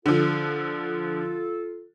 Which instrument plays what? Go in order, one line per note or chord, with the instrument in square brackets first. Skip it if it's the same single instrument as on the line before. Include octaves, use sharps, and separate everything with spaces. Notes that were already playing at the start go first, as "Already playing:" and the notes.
[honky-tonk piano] D3 F3 [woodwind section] F4 A4